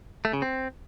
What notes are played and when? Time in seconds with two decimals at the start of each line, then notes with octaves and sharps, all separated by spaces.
0.25 A3
0.33 C#3
0.42 C4